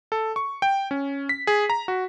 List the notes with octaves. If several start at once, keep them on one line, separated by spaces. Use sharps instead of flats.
A4
C#6
G5
C#4
B6
G#4
A#5
F#4